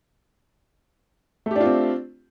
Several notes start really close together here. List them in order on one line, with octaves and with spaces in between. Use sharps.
A3 G4 D4 F4 C4